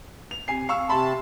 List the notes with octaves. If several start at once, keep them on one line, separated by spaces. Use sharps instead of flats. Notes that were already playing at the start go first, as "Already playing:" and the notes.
F7
C3 G#5 C7
F5 C#6 E6
C3 E5 A5 B5 C6